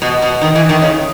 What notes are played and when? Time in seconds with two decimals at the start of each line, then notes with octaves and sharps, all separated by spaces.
0.02 B2
0.22 B2
0.41 D#3
0.55 E3
0.69 D#3
0.82 C#3